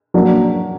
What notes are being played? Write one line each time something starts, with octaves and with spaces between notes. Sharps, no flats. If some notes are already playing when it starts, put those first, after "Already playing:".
F#3 A#3 D4 F#4 A#4